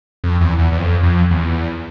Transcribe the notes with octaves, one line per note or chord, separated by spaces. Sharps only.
F2
E2
E2
E2
F2
F2
E2